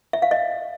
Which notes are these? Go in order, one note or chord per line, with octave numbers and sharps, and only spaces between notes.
E5
F5
D#5